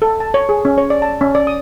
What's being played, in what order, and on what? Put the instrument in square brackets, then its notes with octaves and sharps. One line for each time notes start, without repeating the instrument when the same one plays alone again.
[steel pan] A4
A5
C#5
G#4
C#4
C#5
D5
A5
C#4
D5
D#6